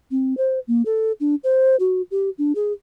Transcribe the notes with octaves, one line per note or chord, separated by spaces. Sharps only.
C4
C5
A#3
A4
D4
C5
F#4
G4
D4
G#4